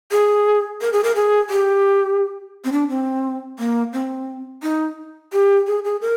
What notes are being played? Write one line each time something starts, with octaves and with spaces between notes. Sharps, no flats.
G#4
A#4
G#4
A#4
G#4
G4
C4
D4
C4
A#3
C4
D#4
G4
G#4
G#4
A#4